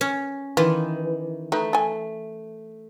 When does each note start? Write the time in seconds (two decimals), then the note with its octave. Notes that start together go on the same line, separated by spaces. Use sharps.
0.01 C#4
0.57 D#3 E3 F4
1.52 A3 D#4 B4
1.73 A4 G#5